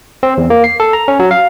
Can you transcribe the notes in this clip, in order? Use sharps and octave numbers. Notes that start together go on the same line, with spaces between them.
C4
E2
A#3
C7
A4
A#5
C#4
F#3
F5